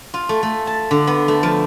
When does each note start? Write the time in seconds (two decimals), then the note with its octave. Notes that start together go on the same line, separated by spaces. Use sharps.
0.14 F4
0.29 A3
0.43 A3
0.67 A5
0.91 D3
1.07 B3
1.28 A3
1.43 F3